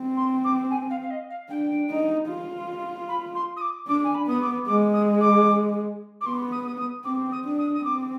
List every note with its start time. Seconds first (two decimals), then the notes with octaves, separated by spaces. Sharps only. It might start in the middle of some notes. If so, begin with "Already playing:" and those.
Already playing: C4
0.17 C6
0.44 D6
0.70 G#5
0.90 F5
1.02 F5
1.10 D#5
1.30 F5
1.50 D4 G5
1.90 D#4
2.29 F4
3.08 B5
3.35 C6
3.56 D#6
3.61 D6
3.88 D4 D6
4.04 G#5
4.14 B5
4.27 B3 D#6
4.41 D6
4.67 G#3 D6
4.94 D#6
5.21 D6
6.21 D6
6.26 B3 C6
6.52 D#6
6.67 D#6
6.79 D#6
7.05 C4 D6
7.32 D#6
7.45 D4
7.59 D#6
7.74 D#6
7.84 C4 D6